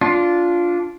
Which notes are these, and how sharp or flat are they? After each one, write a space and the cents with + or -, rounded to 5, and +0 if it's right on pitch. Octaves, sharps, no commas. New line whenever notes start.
D4 -15 F4 +0